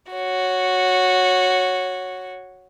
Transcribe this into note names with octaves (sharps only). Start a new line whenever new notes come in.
F#4 C#5